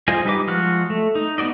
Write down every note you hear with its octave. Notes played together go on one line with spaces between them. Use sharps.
F4 G#4 C5 D#5 G#5
G3 D#4 B4 D#5 D6
F3 G#3 F#4 F6 F#6
A3
D#4
B3 D#4 F#4 D5 D#5